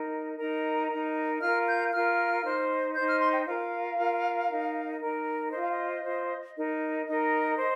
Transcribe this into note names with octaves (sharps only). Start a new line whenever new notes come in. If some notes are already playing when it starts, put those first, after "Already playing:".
Already playing: D#4 A#4
D#4 A#4 A#5
D#4 A#4
F4 A#4 F6
G6
F4 A#4 F6
D#4 C5
D#4 C5 G6
F6
C6
G5
F4 A#4 F5
F4 A#4
D#4 A#4
D#4 A#4
F4 C5 D#5
F5
D#5
F4 C5
D#4 A#4
D#4 A#4 D#5
C5